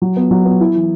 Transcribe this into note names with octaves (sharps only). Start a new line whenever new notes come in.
F#3
B3
F#3
B3
E4
E3